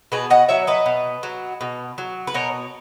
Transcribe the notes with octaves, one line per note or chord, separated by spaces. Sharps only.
B2 G#4 B4
D#5 F#5
F#3 C#5 E5
B4 D#5
B2
F#3
B2
F#3
B4
B2 A#4 C#5